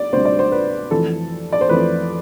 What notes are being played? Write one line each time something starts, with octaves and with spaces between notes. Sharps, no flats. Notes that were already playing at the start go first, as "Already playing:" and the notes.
Already playing: D5
D2 C3 G3 C5
D5
C5
B4
F2 E3 A3 A4
D5
C5
F2 E3 A3 B4